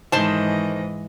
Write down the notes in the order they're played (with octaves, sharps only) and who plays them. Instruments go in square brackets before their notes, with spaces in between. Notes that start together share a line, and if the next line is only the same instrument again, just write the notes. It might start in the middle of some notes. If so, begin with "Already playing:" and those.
[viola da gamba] G#2 E3 D#5 [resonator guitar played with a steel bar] D#3 C5 A5